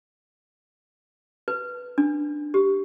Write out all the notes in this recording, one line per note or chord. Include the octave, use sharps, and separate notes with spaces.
B4
D4
G4